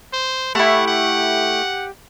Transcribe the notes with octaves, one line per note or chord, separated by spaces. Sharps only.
C5
A3 E4 G4 F#5
F#5